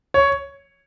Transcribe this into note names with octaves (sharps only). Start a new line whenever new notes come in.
C#5